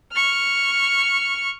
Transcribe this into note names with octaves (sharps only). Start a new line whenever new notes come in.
C#6 F6